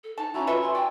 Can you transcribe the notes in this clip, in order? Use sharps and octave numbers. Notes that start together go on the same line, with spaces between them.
A4
D#4 A5
C#4 E4 F#4 A#5
F4 A4 B4 E5
G#5 A5 C6
D5 G5